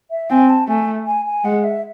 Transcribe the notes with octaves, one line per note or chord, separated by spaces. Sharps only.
E5
C4 G#5
A5
A3 G#5
G#5
G#5
G#3 F#5
E5